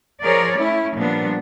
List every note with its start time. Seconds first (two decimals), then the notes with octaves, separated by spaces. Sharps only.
0.23 F3 G#4 A#4 C#5 D5
0.57 A3 C#4 E4
0.96 A#2 F3 G3 B3 D4